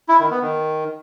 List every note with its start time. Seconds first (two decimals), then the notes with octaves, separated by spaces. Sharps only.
0.09 E4
0.20 D#3
0.31 B3
0.42 D#3